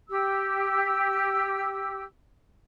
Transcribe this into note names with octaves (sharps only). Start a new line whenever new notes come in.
G4 E6